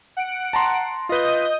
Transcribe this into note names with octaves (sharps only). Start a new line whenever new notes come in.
F#5 D7
A5 A#5 C6
F4 B4 D#5 D#6 G6